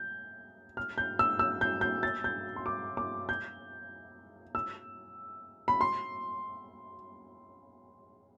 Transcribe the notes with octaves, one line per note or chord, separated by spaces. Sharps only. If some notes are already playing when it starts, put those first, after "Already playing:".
Already playing: G6
F6
G6
E6
E6
G6
G6
A6
G6
C6
D6
D6
G6
E6
B5
C6